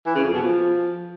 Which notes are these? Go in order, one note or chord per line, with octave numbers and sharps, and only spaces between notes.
E3
C#3
F2
B2
F3